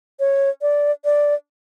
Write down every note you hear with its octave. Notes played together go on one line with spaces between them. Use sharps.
C#5
D5
D5